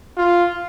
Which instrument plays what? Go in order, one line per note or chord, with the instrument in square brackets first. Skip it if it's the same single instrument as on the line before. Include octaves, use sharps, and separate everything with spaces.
[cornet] F4